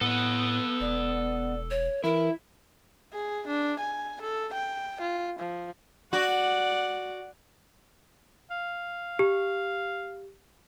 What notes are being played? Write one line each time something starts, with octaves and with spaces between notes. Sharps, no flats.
A2 B3 A4 D#5
E1 D5
C#5
E3 E4 A#4
G#4
D4
G#5
A4
G5
F4
F3
F#4 D5 F#5
F5
G4